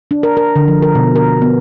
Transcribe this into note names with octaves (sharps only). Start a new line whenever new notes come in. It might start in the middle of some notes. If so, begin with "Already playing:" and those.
D4
A#4
A#4
D3
F3
A#4
B2
A#4
B3